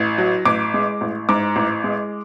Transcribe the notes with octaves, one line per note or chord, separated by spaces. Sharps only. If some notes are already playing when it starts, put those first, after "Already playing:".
Already playing: A1
F#3
A1 D6
G#3
A1
G#2 D6
A1
G#3